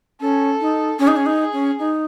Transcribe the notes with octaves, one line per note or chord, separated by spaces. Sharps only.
C#4 A4
D#4
C#4 G#4
D#4
C#4
D#4
G#4
C#4
D#4